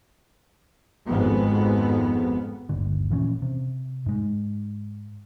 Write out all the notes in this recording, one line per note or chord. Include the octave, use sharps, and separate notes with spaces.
G#1 F2 G#2 B3
D1 G1 D#2 D3
A#2 E3 F3 C#4
C3
G#2 G#3